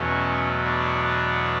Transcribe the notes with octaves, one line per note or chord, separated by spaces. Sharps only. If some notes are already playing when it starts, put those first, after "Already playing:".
Already playing: E2 B2 F#3 A3 C#4
B3 D4